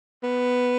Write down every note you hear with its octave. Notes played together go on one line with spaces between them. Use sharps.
B3